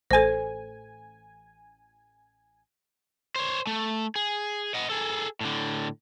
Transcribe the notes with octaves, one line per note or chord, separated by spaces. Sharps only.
A1 A4 C5 G#5
C5 C#5
A3
G#4
D#5 F#5
G#4 A4
A2 D3